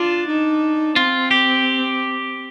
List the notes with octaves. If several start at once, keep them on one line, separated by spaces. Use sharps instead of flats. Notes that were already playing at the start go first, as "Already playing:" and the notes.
Already playing: D4 F4
D#4
C4 F4
G4